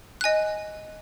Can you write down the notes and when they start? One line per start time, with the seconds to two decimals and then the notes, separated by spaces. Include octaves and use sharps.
0.21 D#5 G#5 F#6